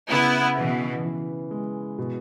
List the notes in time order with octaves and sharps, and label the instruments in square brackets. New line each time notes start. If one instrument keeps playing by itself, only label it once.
[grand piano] C#3 [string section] B3 E4
[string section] B2 E3 [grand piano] B3
[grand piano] E3
G#3
B2